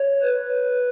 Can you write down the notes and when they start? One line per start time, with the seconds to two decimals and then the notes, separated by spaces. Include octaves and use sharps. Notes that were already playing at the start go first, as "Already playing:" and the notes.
Already playing: C#5
0.22 B4